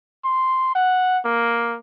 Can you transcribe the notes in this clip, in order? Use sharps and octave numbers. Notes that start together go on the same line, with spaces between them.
C6
F#5
A#3